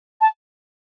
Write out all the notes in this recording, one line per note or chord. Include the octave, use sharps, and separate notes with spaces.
A5